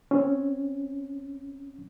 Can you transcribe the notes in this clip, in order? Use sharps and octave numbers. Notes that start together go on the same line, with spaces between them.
C4 C#4